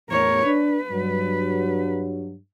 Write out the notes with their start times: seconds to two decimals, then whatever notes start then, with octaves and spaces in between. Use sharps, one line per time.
0.10 E2 A2 A#4 C#5
0.46 D4 B4
0.91 G2 F#3